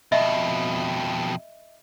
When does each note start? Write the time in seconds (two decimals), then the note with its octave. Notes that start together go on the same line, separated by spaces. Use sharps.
0.12 F2 B2 D#5 E5